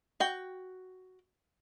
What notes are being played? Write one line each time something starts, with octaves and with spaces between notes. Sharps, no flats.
F#4 G5